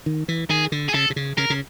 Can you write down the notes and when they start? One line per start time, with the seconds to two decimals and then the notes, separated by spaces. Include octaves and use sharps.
0.06 D#3
0.28 E3
0.49 D#3 G#4
0.72 D3
0.89 G#4
0.94 C#3 A4
1.10 C3
1.16 C#3
1.38 C#3 A#4
1.50 C#3